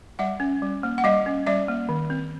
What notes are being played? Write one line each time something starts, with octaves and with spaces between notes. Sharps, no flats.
G3 E5 F#5
C#4
G3
A#3
F#5
G3 D#5 F5
C#4
G3 D5 E5
A#3
D#3
C4